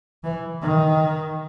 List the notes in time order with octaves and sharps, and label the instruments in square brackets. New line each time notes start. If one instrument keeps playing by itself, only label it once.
[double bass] E3
D#3